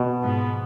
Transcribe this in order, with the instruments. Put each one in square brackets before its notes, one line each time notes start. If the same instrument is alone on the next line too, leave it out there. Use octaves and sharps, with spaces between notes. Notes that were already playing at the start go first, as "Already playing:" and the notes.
Already playing: [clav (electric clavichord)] B2
[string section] G#2 F3 B3